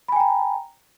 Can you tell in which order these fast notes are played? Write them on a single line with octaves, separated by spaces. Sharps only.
B5 G#5 G5 A#5